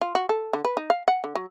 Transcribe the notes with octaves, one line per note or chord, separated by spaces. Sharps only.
F4
F#4
A4
D3
B4
D#4
F5
F#5
D3
F#3